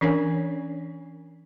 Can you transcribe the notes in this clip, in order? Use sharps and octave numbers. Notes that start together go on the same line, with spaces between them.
E3 C#4 D4 A#4 C#5 G#5